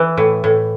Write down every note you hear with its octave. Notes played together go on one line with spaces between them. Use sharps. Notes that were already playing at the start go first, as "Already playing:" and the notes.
Already playing: E3
A2
A2